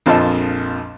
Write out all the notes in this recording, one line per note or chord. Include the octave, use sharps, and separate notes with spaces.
A#1 F2 F3 D#5 A5 E6